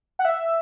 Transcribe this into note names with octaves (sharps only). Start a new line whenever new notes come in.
F#5
E5